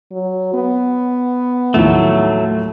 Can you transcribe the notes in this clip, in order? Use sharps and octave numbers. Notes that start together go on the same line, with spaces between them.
F#3
B3
D#2 A2 F3 F#3 A3